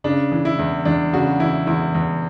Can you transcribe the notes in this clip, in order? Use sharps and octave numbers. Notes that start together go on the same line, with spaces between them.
C#3 D4
E3
E4
E2
E2 D4
C#3 F#4
E3 E4
E2 E4
E2